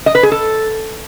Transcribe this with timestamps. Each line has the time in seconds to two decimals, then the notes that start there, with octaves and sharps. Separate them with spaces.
0.06 D#5
0.15 B4
0.23 G#4
0.32 A4